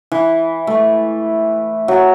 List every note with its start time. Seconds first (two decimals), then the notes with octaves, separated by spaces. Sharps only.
0.12 E3
0.67 A3
1.88 F#3